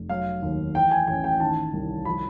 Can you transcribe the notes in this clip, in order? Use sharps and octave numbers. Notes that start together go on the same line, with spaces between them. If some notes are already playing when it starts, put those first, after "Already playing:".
Already playing: F1
F#3 F5
D#2
E3 G5
G#5
A1 G#5
G5
D#3 A5
C2
F3 B5